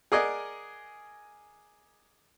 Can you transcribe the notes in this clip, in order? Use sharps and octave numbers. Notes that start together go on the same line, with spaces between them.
G#4 A#4 D5 D#5 F#5 G#5